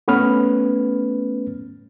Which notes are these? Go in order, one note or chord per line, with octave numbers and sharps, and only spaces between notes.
A3 B3 C#4 B4 F6